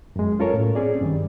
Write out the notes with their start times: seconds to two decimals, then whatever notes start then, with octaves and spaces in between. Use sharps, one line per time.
0.16 F#2 G#3
0.39 C#4 F4 A4 A#4 C#5
0.54 A2
0.75 C4 C#4 G#4 D5
1.01 G2 D#3 G3